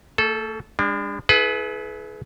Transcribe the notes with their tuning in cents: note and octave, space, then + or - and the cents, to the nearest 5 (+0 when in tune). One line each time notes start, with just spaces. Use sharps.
A3 +40 A4 -20
G#3 -45 D4 +0
E4 +0 G#4 +40 B4 +0